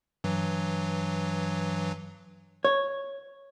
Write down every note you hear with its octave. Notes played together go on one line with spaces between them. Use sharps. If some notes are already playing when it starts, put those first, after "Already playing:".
G2 E3 F#3
C#5